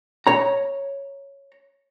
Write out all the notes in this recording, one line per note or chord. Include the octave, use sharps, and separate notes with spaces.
C#5 A#5